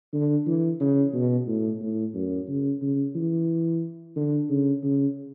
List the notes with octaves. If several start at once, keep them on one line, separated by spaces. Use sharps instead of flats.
D3
E3
C#3
B2
A2
A2
F#2
C#3
C#3
E3
D3
C#3
C#3